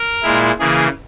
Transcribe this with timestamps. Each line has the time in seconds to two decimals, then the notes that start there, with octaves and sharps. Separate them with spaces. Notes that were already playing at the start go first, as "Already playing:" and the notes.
Already playing: A#4
0.23 A#2 G#3 E4
0.59 C#3 E3 A#3 G#4